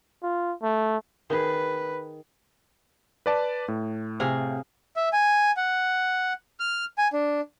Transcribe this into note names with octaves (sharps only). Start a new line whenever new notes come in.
F4
A3
D#3 G#4 B4
B4 D5 A5
A2
C3 G#4 F5
E5
G#5
F#5
F6
G#5
D4